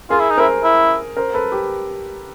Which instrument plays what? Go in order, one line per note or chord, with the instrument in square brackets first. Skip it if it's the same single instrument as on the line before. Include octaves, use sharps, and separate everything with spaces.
[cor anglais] F4 [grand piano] G#4 A#4
[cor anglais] E4
D#4
[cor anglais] E4 [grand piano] A#4 C5
[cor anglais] E4
[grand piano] A#4 C5
A4 B4
G4